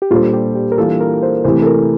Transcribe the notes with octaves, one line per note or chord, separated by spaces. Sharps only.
G4
A#2 G3 D4 F4 A4 C5
G4
G4
A#4
E3 G3 A#3 D4 F4 A4
A#4
C5
C3 E3 A3 E4 G4 C5
A4
A#4